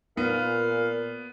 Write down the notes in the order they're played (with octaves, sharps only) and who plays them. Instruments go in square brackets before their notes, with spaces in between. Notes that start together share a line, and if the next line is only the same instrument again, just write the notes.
[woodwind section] A#2 [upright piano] B3 [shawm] F5